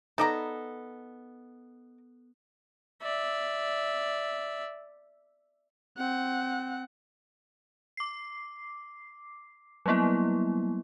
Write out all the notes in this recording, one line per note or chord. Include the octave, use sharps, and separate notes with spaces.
B3 D#4 A4 D5 A#5
D5 E5
C4 F#5
D6 C7
F#3 G3 A#3 B3 E4